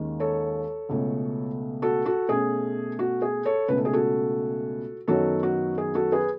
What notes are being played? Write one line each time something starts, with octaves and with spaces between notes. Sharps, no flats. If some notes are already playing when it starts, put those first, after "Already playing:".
Already playing: D#2 D#3 G#3 C#4
A4 C#5
C#2 B2 A3 C#4
F#4 A4
F#4 A4
B2 A3 C#4 G#4
F#4
G#4
A4 C#5
C#2 B2 A3 C#4 B4
A4
G#4
F#4 A4
F#2 D#3 F#3 B3 F#4 A4
F#4
G#4
F#4 A4
G#4 B4